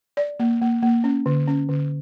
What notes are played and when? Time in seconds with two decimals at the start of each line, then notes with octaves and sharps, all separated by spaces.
0.17 D5
0.40 A#3
0.61 A#3
0.82 A#3
1.04 C#4
1.26 D3
1.47 C#4
1.69 D3